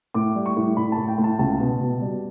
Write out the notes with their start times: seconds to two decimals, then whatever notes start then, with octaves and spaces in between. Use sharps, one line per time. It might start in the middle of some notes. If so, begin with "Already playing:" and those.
0.14 A2 D6
0.35 G3
0.46 C#6
0.57 A2
0.77 A2 B5
0.92 A5
0.97 A2
1.08 G5
1.18 A2
1.24 A5
1.39 C#2 A5
1.60 B2
1.80 B2
2.01 G3